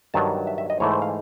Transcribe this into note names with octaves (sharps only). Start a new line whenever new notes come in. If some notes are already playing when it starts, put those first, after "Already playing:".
G2 D#3 F#3 A5
E5
E5
D#5
G#2 E3 A3 C#5
C5
F5